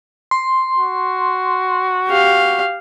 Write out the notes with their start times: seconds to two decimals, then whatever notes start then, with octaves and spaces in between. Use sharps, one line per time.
0.31 C6
0.76 F#4
2.08 G4 F5